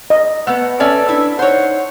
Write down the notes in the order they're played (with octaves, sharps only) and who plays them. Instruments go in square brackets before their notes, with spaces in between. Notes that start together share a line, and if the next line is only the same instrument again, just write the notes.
[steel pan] D#5
[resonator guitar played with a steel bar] A3 B3 [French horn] B4 [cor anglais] F#5
[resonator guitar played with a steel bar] C#4 D5 E5 [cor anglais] A4
[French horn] D4 [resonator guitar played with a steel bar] E4
[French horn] D#4 [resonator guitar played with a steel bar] C5 C#5 [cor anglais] F#5